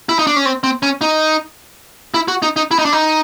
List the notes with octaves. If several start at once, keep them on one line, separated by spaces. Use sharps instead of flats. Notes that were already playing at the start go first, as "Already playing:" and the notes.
E4
D#4
D4
C#4
C4
C4
C#4
D#4
E4
F#4
D#4
D#4
E4
D#4
D4
D#4